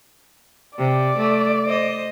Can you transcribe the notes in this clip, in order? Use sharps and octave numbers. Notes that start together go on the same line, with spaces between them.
C3 D5
A3
C5 D#5